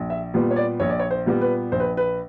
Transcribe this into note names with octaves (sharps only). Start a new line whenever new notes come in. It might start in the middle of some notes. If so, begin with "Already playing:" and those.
Already playing: A#1
E5
A#2 G3 B3
C#5
D5
A#1 C#5
D5
C#5
C5
A#2 G3 B3
B4
A#1 C5
B4
B4